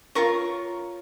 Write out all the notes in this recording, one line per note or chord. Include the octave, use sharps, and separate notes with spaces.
F4 A#4 C#5 C#6